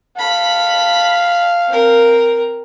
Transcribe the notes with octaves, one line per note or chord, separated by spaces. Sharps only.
A4 F5 B5
C4 A#4